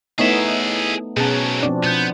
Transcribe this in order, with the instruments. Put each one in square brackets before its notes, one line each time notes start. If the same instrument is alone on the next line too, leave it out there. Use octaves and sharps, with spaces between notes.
[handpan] A3 B3 D#4 [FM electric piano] E4 C#5 D#5 [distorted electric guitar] G#4 E5
[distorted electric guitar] G#2 F#3 [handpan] B2 C#4 [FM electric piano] G#4 A5
[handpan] F3 C4 D4 [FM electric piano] D5
[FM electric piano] B2 G6 [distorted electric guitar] B3